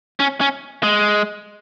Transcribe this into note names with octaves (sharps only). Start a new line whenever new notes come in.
C#4
C#4
G#3